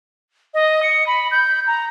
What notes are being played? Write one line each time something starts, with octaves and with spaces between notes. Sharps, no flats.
D#5
C#7
B5
G6
A#5